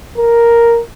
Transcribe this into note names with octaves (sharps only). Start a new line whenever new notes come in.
A#4